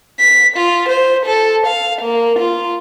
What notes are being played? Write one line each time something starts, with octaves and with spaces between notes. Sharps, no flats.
B6
F4
C5
A4
F5
A#3
F4